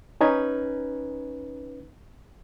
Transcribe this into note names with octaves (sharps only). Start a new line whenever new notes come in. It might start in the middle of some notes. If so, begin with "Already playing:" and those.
C#4 D#4 B4 G#6